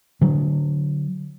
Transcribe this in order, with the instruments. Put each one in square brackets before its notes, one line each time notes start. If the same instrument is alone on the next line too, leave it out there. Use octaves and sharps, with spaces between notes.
[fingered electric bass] D3 F#3